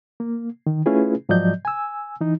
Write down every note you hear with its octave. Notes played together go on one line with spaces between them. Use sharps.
A#3
D#3
A3 C#4 E4 F4 G#4 B4
G#2 F3 F#3 D5 D#5 G6
G#5 E6
E3 D#4